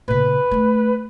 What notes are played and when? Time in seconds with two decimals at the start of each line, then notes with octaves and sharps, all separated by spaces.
0.08 A#2 C#3 B4
0.51 A3 D#4